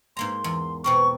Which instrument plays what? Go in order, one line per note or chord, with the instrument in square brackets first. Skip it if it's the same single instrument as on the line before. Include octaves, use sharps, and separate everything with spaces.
[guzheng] G#2 A#3 A#5 [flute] C6
[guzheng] E2
[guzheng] B2 C4 A#4 [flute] C#6